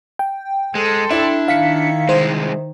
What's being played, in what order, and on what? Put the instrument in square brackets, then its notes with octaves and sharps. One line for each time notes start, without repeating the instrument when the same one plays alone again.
[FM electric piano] G5
[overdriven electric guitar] G#3 [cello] A4 C5
[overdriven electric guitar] D4 [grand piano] E4
[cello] D#3 [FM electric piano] F5 B6 C#7
[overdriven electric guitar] C2 G#3 [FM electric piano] C5